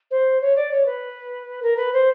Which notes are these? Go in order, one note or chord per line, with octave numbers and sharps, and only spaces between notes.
C5
C#5
D5
C#5
B4
A#4
B4
C5